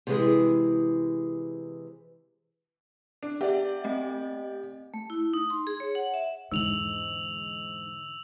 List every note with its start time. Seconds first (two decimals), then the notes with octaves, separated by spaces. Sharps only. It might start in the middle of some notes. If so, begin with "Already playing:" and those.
0.07 C3 E3 G#3
3.23 D4
3.41 B3 G4 D5 E5 F#5
3.84 A3 C4 D#5
4.94 A3
5.10 E4
5.34 D#4
5.50 C6
5.67 G#4
5.80 C#5
5.95 F#5
6.14 E5
6.51 E2 G#2 D3 E6 F7 F#7